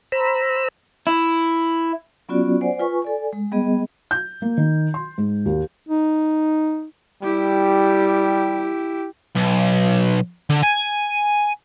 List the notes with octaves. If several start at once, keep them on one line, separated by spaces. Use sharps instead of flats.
C5 A#5 B5 E6
E4
F#3 B3 C#4 F4 F#4 D5
C5 D5 F#5 G#5
F4 B4 G#5 C#6
A4 D5 G#5
G#3
G3 B3 G#4 D#5
G6
A#3
D#3
C6
G#2
D#2
D#4
G3 E4 G4
B1
D3
G#5